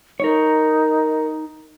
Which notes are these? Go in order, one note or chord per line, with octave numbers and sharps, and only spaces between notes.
D#4 A#4 C#5